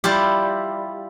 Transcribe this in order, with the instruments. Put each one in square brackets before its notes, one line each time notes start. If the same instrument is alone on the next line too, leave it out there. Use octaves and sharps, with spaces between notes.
[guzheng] G3 E4 F4 G4